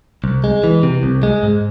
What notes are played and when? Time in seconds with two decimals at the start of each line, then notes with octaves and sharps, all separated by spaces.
0.24 C2
0.44 G#3
0.64 E3
0.83 C3
1.03 C2
1.23 G#3
1.43 G#2